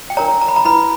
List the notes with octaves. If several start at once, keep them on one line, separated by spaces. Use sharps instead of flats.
G5
D4 A#4 C#5 A#5
A#5
B5
A#5
E4 B4 B5